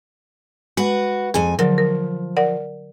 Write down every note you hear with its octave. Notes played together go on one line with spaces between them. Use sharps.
G#3 F#4 B4
F2 G#4 G#5
D3 F3 F#3 A#4
A#4
A#4 D5 F#5